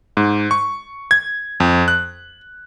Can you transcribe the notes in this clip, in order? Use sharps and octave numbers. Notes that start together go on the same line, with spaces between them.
G#2
C#6
G#6
F2
F#6